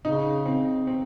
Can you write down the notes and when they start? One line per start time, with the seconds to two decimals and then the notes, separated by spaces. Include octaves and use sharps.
0.05 C#3 D#4
0.46 C4
0.87 C4